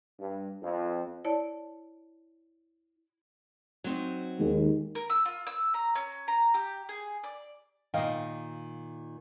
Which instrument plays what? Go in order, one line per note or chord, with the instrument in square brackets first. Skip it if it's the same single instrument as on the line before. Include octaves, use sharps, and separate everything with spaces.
[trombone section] G2
F2
[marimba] E4 C#5 D5 A5
[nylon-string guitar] F#3 C4 D#4
[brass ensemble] D#2 [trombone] G#3
[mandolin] A#4
E6
F4
E6
A#5
C#4
A#5
G4
G#4
D5
[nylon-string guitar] A#2 D#3 [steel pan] D#5 F5 G5